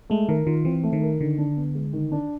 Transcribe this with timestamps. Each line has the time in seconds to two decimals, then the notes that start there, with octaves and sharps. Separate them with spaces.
0.10 G#3 A3
0.29 D#3 A#4
0.47 D#3 F4
0.65 E3 C4
0.83 A3
0.93 D#3
1.02 A#4
1.20 D3 D#3
1.38 D4
1.57 B3
1.75 G#3
1.93 D#3
2.12 D4